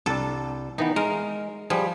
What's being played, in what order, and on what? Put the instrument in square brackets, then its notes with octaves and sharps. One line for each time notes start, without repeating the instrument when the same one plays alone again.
[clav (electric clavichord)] C2 D4 [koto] A4
[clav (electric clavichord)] D#3 E3 B3 [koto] D#4
[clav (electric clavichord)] G#3 [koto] A#4
[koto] F3 [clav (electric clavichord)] G3 G#4